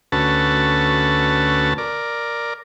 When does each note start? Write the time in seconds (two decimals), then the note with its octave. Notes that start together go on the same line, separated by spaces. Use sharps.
0.12 D2 C#4 F#4 A4 B4 A5
1.78 A#4 D5